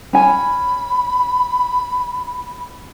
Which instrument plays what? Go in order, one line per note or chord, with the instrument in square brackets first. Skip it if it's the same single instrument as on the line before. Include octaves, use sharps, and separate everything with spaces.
[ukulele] C#4 G#5 [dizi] B5